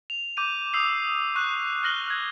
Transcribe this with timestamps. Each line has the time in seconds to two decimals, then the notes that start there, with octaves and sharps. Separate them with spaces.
0.10 F7
0.37 D6 G6 D#7
0.73 D#6 E6 G6 C7 F7
1.36 C#6 F#6
1.83 F6 F#6 A#6 F#7 G7
2.07 F#6 G#6